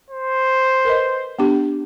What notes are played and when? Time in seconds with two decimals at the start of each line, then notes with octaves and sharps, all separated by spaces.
0.11 C5
0.85 A#4 B4 D#5
1.39 B3 D4 G4